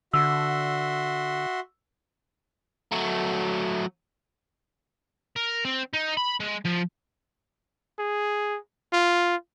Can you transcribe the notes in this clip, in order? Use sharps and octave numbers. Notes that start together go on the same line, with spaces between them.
D3 F#4 E5 C6 E6
F#3 A3
A#4
C4
D#4
B5
G#3
F3
G#4
F4